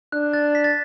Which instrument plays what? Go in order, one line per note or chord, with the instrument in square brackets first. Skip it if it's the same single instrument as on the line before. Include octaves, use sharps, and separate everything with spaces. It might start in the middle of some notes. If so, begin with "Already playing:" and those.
[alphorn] D4 [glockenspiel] F#6
[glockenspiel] F#6 A6
B6
A6